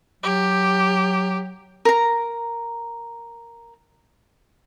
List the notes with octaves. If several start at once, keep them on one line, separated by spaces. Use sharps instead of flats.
F#3 G4
A#4 A#5